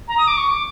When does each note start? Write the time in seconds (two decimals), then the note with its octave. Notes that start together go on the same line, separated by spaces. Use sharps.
0.08 A#5
0.18 D#6
0.28 D6
0.37 C#6
0.51 D6